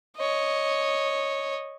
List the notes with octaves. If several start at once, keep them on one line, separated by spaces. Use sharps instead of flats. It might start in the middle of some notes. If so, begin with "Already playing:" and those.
C#5 D#5